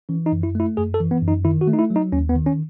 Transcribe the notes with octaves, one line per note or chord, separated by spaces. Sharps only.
E3 C#4
D#4
F#2
E4
A3 E4
F#2 G#4
A4
E3
B3
F#2
D#4
D#3 E4
F#4
A3
D#4
E4
F#3
D#4
D#2 C#4
B3
D#3
C#4